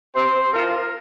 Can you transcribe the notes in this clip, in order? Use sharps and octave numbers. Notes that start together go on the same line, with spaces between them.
C3 C4 C5
F3 F4 A#4